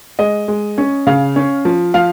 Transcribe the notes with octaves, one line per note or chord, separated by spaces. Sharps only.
G#3 D#5
G#3
C#4
C#3 F5
C#4
F3
F3 F5